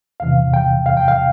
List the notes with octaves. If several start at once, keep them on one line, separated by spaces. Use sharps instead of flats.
E2 C3 E3 F5
G5
F5
G5
F5